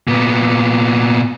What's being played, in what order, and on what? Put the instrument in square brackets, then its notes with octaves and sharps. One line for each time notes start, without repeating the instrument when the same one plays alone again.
[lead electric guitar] A#2 B3